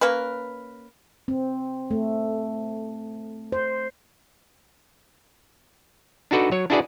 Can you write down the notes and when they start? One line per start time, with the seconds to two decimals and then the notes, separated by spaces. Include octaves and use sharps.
0.01 A#3 C#4 A#4 B4
1.28 C4
1.91 A3
3.52 C5
6.31 D4 D#4 F#4 A4 B4 D5
6.52 F#3 C#5
6.70 D4 E4 F#4 G#4 B4 D5